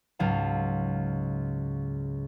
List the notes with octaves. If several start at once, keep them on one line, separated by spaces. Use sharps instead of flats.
C#2 G#2 F#3 F5 A5